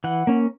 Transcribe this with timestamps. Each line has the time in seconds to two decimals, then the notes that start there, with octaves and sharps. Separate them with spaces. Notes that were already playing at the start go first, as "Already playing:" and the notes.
0.04 E3 F#5
0.27 A#3 C#4